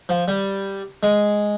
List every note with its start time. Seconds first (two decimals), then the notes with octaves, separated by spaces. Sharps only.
0.09 F3
0.28 G3
1.03 G#3